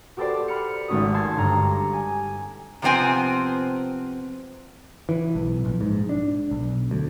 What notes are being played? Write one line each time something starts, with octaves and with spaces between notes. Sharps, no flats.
F#4 G4 A4 B4 C5 D5
B5 F6 C#7
G#1 G#3 A3 C#4 F#4 D#6
A5 C6 E6 G#6 A6
G1 G2 A#5 C#6
G#5
C3 F3 B3 C4 G#5
E3
B1
A#1
G#2
D4
B1
D2